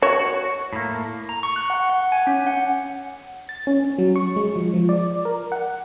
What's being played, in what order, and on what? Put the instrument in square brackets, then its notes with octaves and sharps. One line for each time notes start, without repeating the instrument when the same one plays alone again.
[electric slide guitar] F#4 [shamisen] C#5
[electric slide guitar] A2 A#3
[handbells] A#5
C#6
F#6
F#5
F#5
G#5
C#4
F#5
[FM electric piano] A6
C#4
F#3
C#6
G#3
F3
F3
D5
A#4
F#5